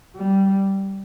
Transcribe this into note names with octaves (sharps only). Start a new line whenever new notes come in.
G3